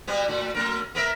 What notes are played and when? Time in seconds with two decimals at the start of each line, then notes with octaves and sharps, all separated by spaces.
0.07 B2 G3 B3
0.28 A2 F#4
0.54 F#2 A3 A#4
0.95 B3 A#4 E5